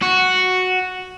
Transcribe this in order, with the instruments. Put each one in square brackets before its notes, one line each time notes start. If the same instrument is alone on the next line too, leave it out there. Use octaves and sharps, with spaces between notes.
[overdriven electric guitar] F#4